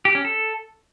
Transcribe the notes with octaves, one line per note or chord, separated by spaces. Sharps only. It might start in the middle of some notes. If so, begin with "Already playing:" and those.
G4
C#4
A4